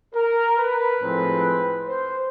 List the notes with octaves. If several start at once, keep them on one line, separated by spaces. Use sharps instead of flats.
A#4
B4
A2 F3 G#3 C4
C5